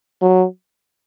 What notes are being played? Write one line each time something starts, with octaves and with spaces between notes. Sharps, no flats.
F#3